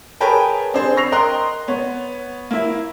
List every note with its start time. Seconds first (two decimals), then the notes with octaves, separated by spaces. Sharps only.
0.21 G#4 A#4 B4 C#5 G5 A5
0.74 C4 D4 G#4 C5
0.97 C#6 E6 A#6 C7 F7
1.12 A#4 D#5 G5 A#5 C6 F#6
1.68 B3 C#5
2.51 A#3 E4